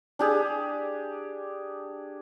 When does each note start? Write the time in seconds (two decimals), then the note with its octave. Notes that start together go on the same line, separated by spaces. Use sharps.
0.19 D4 G4 G#4